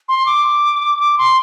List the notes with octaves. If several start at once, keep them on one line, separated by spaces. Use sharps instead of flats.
C6
D6
D6
C6